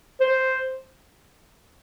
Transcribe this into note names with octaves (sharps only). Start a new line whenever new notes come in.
C5